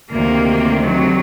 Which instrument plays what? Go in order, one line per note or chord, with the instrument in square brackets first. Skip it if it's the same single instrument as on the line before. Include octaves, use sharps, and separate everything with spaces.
[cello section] D2 C3 D#3 [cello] A#3
[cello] F#3